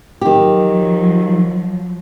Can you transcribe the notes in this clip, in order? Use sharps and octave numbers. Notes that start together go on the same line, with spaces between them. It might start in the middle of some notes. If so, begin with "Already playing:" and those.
D#3 F3 F#3 G4